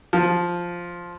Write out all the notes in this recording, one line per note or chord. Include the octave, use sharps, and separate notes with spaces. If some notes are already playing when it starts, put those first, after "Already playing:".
F3